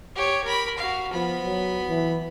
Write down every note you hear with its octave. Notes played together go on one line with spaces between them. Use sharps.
G4 C#5
A#4 B5
F#4 F5
F3 B3 B5
F#3
E3